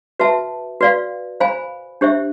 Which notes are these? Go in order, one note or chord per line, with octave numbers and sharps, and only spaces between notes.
F#4 B4 E5 A5
F#4 B4 D5 F5
C5 F5 G#5 B5
D4 G4 C5 E5